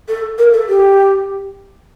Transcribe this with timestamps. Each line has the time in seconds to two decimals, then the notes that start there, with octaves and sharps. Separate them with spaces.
0.08 A4
0.38 A#4
0.53 A4
0.69 G4